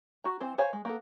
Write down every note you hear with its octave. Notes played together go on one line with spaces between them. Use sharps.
F#4 A#5
E3 C4 C5
C5 C#5 F5 G#5 B5
G#3
A#3 B3 A4